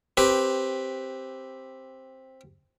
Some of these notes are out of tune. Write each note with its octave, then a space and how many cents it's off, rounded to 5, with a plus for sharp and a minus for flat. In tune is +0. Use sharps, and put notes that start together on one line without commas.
C4 +10 G4 +0 B4 +0